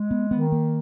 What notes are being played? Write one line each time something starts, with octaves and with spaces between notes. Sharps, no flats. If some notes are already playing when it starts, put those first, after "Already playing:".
Already playing: G#3
B3
D#3 B3
A#3